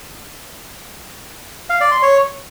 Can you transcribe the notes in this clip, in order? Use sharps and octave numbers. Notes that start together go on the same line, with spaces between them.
F5
D5
C6
C#5